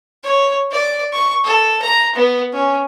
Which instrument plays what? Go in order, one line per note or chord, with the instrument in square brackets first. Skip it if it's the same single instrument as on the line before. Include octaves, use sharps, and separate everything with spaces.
[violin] C#5
D5
C#6
A4
A#5
B3
C#4